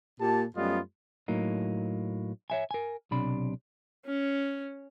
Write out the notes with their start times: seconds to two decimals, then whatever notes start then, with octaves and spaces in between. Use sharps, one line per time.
0.20 A#2 A#3 G4 A5
0.55 F#2 G3 A3 B3 F4 D#5
1.28 A2 F#3 A#3 D#4
2.50 C#5 E5 G#5
2.71 A#4 G#5
3.11 B1 C3 D4 B5
4.06 C#4